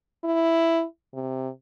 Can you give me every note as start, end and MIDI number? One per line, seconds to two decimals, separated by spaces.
0.24 0.84 64
1.14 1.49 48